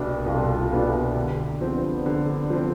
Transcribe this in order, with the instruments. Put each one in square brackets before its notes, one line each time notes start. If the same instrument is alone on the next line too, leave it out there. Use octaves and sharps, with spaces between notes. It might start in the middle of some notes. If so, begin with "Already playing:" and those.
Already playing: [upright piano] C2 B2 B3 D4
[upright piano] C2 [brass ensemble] F4 A4
[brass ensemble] F4 A4
[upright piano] B2 B3 D4
[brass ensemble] E4 G4
[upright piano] D3
[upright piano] F3 C4 [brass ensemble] B3 D4
[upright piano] D3
F3 C4